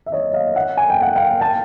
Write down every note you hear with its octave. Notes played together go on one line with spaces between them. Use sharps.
E5
C#5 D#5
D#5 F5
E5 F#5
G#5
G5
F#5
F5 G5
G5 A5